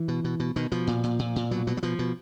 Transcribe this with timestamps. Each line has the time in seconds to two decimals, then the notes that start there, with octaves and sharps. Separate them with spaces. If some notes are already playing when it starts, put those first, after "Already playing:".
Already playing: E3
0.08 B2
0.24 B2
0.40 B2
0.56 B2 D#3
0.72 B2 F3
0.87 A#2
1.03 A#2
1.19 A#2
1.36 A#2
1.51 B2 F#3
1.67 B2 F#3
1.77 F#3
1.83 B2 F3
1.99 B2